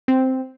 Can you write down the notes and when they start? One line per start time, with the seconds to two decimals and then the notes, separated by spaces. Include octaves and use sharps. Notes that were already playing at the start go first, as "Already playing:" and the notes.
0.08 C4